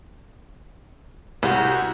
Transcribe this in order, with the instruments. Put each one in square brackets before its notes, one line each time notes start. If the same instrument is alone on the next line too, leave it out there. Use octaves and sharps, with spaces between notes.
[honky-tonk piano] C2 [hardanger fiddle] F#4